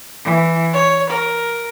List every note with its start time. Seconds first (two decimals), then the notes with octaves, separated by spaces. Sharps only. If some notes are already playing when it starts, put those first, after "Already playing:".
0.24 E3
0.73 C#5
1.11 A#4